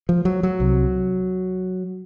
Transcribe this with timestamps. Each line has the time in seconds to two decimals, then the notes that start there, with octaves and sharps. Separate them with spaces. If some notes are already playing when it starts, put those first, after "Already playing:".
0.09 F3
0.25 F#3
0.43 F#3
0.60 C2 C3